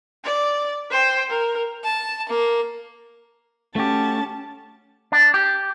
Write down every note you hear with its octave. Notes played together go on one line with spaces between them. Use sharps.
D5
C5 G5
A#4
A5
A#3
A3 C#4 F#4 G4 A5
D4
G4